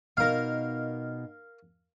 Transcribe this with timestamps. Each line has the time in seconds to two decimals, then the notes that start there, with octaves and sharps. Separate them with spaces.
0.17 B2 D#4 A#4 F5